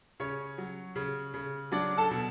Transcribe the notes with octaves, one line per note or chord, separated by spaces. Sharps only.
C#3 C#4 C#5
F#3
C#3
C#3
F#3 D4 D5
A4 A5
B2